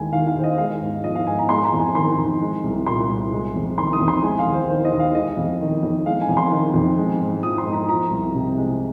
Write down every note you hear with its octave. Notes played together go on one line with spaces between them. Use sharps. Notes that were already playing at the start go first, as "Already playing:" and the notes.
Already playing: D#2 G#3 G#5
D#3 F5
F5
D#2 C5
D#5
G#3 F5
G#2
F3 D#5
F5
G#2 G#5
A#5
G#3 C6
A#5
F2
G#5
D#3 C6
F2
G#3
C2
A#2 C6
C2
G#3
F2
D#3 C6
D#6
F2
C6
G#3 G#5
F5
D#2
C5
D#3 C5
D#5
D#2
F5
G#3 D#5
F2
D#3
F2
G#3 F5
G#5
F2
C6
D#3
F2
G#3
G#2
F3 D#6
C6
G#2
A#5
F3 A#5
C2
C3
G#3